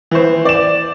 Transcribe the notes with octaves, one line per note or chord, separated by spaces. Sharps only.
E3 C5
D5 E7